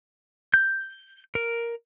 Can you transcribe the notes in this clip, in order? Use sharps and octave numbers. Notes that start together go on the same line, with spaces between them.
G6
A#4